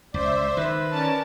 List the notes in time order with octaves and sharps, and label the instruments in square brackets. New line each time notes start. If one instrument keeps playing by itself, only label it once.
[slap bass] C#2 [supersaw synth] C5 E5 [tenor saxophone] D5
[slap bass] D#3 [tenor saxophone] B4
[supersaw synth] C#4 [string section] A#4 D5 A5